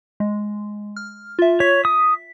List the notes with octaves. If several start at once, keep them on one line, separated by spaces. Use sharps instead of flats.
G#3
F6
F4 E5
C#5 B6
D#6